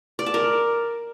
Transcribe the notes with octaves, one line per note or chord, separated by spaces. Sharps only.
D5
A5
A#4